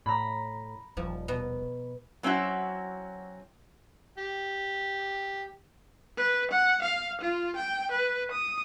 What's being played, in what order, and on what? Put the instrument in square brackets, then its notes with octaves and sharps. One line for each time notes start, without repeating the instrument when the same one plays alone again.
[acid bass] A2 [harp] A#5 B5
[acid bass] D#1 [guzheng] F3
[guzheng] B2
[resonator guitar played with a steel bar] F#3 C4 C#4 E4 F#4
[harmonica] G4
[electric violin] B4
F#5
F5
F4
G5
B4
D#6